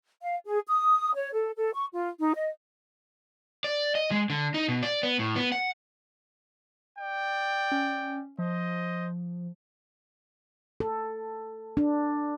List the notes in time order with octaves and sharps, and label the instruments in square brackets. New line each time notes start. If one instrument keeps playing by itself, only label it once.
[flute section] F5
G#4
D#6
C#5
A4
A4
C#6
F4
D#4
D#5
[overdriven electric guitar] D5
D#5
G#3
D3
D#4
B2
D5
B3
A2
B3
F#5
[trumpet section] D5 G5
[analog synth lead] C#4
[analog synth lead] F3 [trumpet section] C5 D#5
[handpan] A4
D4